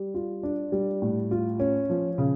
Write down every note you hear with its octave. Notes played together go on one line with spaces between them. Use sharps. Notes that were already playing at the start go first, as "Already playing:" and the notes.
Already playing: G3
F4
D4
G3
A2
F4
C#4
F3
C#3